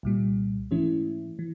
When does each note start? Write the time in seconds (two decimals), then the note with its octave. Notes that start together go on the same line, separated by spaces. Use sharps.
0.03 C2 A#2 G3
0.71 G#2 E3 A3 C#4 E4
1.39 E3